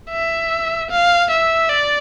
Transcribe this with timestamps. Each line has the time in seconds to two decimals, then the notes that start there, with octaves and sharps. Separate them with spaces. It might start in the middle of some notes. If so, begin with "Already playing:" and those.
0.10 E5
0.91 F5
1.30 E5
1.69 D5